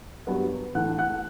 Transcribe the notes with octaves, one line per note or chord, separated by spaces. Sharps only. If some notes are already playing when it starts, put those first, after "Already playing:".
G2 F#3 B3
A2 E3 A3 F#5 F#6
F#5 F#6